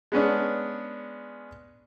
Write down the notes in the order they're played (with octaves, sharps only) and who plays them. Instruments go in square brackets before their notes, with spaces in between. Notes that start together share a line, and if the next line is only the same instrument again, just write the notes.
[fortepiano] G#3 B3 C#4 D4